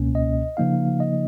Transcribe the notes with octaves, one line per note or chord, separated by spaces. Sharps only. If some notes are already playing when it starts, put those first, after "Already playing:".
Already playing: C#2 B2 A#3 C#4
D#5
C#3 F3 A#3 D#4 F5
D#5